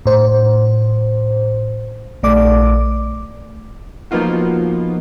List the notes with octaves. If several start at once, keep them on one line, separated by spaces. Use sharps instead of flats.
A2 C5
A#1 A3 D5 D6
F3 A#3 B3 D#4 F4 F#4